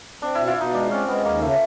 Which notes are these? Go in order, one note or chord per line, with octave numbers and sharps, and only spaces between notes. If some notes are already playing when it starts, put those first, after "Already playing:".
C4 D4
B2 E4
F4
B2 D#4
G#3 D4
C4 C#4
G#3 B3
D#2 A#3
C#3 A3